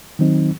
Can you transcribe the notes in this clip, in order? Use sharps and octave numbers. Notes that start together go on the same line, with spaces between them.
D#3 F#3 C4 D#4